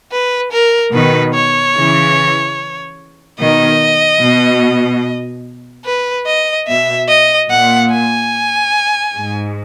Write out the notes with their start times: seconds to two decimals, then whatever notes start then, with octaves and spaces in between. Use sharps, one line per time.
0.12 B4
0.52 A#4
0.93 B2 D#3 B4
1.34 C#5
1.75 C#3 E3
3.39 B2 D#3 D#5
4.21 B2
5.85 B4
6.27 D#5
6.67 B2 E5
7.08 D#5
7.49 A#2 F#5
7.91 G#5
9.14 G#2